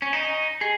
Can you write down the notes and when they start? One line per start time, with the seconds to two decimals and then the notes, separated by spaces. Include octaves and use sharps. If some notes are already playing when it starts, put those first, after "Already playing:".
0.02 C#4
0.13 D#4
0.61 G#4